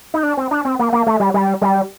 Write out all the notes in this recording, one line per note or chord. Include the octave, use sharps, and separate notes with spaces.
D#4
D4
C4
D4
C4
A#3
A#3
A3
G3
G3
G3